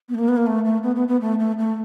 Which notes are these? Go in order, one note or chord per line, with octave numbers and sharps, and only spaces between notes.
B3
A3
A#3
B3
A#3
A3
A3
B3
B3
B3
A3
A3
A3